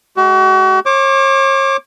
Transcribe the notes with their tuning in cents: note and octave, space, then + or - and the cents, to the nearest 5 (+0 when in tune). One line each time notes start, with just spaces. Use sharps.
G#3 +25 F#4 +40
C#5 -40 D6 +0